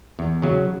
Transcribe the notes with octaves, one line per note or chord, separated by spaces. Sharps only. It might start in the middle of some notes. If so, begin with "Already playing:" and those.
E2
C#3 F#3